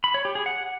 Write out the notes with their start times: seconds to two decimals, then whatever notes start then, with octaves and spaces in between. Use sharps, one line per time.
0.04 B5
0.14 C#5
0.25 G4
0.35 G#4
0.46 F#5